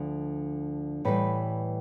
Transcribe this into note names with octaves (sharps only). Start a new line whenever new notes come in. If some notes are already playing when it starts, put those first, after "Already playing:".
Already playing: D2 D3 F3
A2 E3 G3 B4